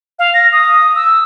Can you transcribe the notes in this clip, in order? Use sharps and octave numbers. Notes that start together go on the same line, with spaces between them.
F5
A#6
D#6
E6